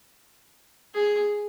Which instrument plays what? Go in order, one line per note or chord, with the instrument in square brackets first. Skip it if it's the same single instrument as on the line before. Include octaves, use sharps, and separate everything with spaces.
[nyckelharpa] G#4